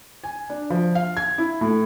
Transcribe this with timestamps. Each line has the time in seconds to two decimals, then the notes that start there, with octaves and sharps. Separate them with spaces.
0.23 G#5
0.50 D4
0.70 F3
0.95 F5
1.17 G#6
1.38 E4
1.61 A2